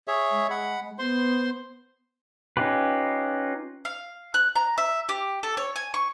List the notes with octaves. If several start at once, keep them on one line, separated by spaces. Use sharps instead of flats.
G#4 C#5 E5
G#3
F#5 B5
B3 C5 C6
C#4 D#4 F4 G4 B4
F5
F#6
A#5
E5
G4
A4
C#5
G#5
C#6